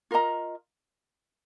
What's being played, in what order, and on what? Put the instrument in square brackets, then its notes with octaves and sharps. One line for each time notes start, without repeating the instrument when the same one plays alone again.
[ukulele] F4 A#4 D#5 A#5